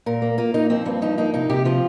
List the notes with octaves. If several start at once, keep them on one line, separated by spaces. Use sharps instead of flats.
A#2 A#4
A#3
A#3 F4
A#3 D#4
F3 C4
G2 C4
F3 D#4
A#3 D#4
C3 D#4
C3 G4
F3 F4